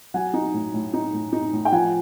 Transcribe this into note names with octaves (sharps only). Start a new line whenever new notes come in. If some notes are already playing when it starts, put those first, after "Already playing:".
F#3 F#5 G#5
D#4
A2
A2
D#4
A2
D#4
A2
G5
F3 F#5 G#5